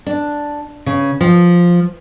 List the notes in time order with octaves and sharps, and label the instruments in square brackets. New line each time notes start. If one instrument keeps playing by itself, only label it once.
[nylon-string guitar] D4
C#3
F3